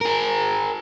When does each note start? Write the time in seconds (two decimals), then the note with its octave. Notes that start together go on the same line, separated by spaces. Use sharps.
0.01 G#4 A#4